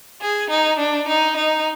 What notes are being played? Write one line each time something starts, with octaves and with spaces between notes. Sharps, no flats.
G#4
D#4
D4
D#4
D#4